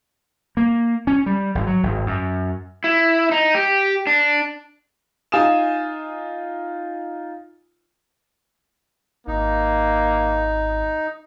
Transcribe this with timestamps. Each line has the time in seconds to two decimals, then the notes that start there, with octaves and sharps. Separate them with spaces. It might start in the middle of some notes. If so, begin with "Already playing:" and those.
0.57 A#3
1.07 C#4
1.26 G3
1.55 G#1
1.67 F#3
1.83 G#1
2.06 F#2
2.84 E4
3.32 D#4
3.55 G4
4.07 D4
5.32 D#4 F4 G#5 D#6 E7
9.27 G#1 A#3 D#4